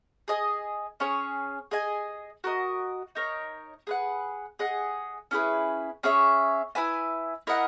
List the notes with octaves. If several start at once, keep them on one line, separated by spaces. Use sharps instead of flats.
G#4 D#5 G#5
C#4 G#4 C#5
G#4 D#5 G#5
F#4 A#4 D#5
D#4 A#4 C#5
G#4 B4 F#5
G#4 D#5 F#5
C#4 E4 G#4 B4
C#4 G#4 C#5 E5
E4 B4 E5 G#5
E4 A#4 D#5 F#5